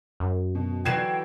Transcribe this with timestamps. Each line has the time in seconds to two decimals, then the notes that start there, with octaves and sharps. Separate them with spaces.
0.20 F#2
0.55 B2
0.85 D3 E3 F#3 G5 G#6 C7 E7